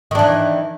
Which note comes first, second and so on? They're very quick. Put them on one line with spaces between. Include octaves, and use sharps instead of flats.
D#3 D4 E3